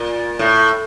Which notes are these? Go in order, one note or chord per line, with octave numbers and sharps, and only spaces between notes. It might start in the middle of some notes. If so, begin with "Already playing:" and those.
Already playing: A#2
A2